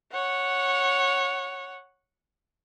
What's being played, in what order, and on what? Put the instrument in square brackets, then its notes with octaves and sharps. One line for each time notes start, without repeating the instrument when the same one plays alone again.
[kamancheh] C#5 F#5